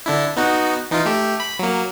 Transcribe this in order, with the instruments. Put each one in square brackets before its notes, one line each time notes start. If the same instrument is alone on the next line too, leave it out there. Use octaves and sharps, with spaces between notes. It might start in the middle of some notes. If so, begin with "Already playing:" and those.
[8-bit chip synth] D3 D4 E4
B3 D#4 F#4
E3 D#4 F4
A3 G4
B5
F#3 A#3